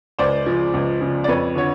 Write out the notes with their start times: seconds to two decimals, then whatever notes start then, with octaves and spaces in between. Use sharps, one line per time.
0.19 C#2 C5 D5
0.46 C#3 F3
0.74 C#2
1.00 C#3 F3
1.24 D5
1.28 F2 B4 C#5
1.55 D3 F3 C#5